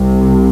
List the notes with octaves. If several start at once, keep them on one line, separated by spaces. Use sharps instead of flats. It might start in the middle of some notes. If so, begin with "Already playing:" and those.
Already playing: C2 C3